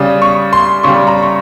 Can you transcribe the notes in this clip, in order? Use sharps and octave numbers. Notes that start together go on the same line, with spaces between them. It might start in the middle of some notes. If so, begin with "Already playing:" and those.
Already playing: C#3 G3 D#6
C#6
C6
C#3 G3 C#6
A#5
C#6